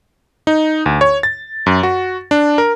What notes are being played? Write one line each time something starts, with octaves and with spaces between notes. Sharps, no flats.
D#4
D2
C#5
A6
F#2
F#4
D4
A#4